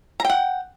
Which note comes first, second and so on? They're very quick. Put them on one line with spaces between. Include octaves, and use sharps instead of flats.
A#5 G5 F#5